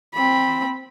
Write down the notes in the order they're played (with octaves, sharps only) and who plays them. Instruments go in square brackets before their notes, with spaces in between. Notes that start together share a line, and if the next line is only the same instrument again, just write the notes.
[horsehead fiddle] C4 B5